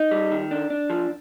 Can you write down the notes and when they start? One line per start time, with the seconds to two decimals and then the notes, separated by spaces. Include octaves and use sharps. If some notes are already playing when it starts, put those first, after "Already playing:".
Already playing: D#4
0.11 G3
0.32 D#3
0.51 D4
0.70 D4
0.90 F3